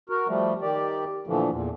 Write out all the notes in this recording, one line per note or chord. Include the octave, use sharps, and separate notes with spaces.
F#4 A#4
F3 G3 A3
D#3 G4 D5
A#2 D3 E3 F3 A3
E2 A#2